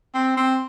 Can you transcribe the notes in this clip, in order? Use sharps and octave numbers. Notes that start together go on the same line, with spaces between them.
C4
C4